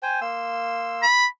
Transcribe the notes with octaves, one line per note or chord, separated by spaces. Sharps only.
C5 G5 G#5
A#3 C6 E6
B5